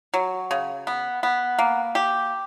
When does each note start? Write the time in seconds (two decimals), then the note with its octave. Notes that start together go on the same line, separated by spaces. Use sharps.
0.14 F#3
0.51 C#3
0.87 B3
1.23 B3
1.59 A#3
1.95 G4